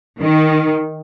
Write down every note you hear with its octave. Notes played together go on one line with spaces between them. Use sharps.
D#3